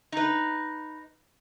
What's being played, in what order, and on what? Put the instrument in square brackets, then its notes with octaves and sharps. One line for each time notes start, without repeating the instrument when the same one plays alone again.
[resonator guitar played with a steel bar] D#4 B4